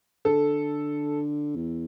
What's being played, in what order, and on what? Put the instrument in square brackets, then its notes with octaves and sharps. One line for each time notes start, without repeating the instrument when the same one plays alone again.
[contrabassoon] D3 [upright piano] A4
[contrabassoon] E2